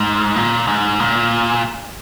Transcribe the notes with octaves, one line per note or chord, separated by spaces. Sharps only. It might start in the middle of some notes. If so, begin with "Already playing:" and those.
Already playing: G#2
A#2
G#2
A#2